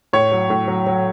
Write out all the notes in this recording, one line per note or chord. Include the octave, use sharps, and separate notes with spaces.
A2 C#5
F#3
A2
F#3
F#3